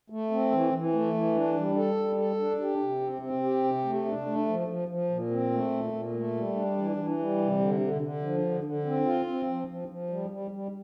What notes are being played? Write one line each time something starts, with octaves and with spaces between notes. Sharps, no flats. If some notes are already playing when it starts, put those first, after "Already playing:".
A3
C4
E3
E3
A3
E3
D4
G3
A4
G3
A4
D4
G4
C3
C4
C4
G4
C3
A3
D4
A3
F3
F3
F3
A#2
C4
A3
A#2
A#2
A3
G3
D4
E3
E3
G3
C3
D3
D3
D3
F3
D3
D3
C4
F4
C4
F3
F3
F3
G3
G3
G3